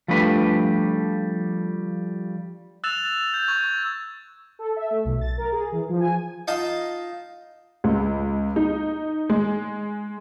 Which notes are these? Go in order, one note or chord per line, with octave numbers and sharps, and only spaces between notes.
F3 G3 A3 D4 B4
E6 F#6 A6 E7 F7
G6
C#6 G#6
A4
E5
A3
B1
A6
A#4
G#4
E3
F3
G#5
D#4 F4 D#5 A5 D#6
C#2
D#4
G#3